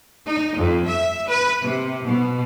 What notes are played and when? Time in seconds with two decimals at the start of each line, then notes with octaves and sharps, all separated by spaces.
0.25 D#4
0.56 F2
0.84 E5
1.27 B4
1.60 C3
2.06 B2